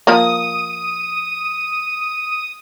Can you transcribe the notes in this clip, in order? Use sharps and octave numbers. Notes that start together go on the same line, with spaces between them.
F3 A#3 D#6